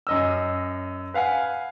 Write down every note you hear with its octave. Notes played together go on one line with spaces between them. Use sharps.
F#2 D#5 E6
B4 F5 F#5 G#5